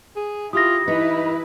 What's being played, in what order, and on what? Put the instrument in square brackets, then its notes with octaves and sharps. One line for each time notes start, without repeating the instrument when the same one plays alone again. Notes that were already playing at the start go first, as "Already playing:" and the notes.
[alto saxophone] G#4
[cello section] E4 [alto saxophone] F4 [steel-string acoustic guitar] G4 [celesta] D#6 A#6
[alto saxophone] E3 [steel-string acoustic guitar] D#4 [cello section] E4 B4